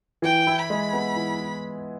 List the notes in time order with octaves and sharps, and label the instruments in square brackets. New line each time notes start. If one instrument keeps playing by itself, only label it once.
[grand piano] E3 [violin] G5
[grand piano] E4
[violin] B5
[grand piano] G#3
B3
E3
E4